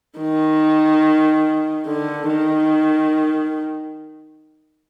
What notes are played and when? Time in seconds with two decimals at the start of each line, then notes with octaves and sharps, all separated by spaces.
0.19 D#3
1.87 D3
2.28 D#3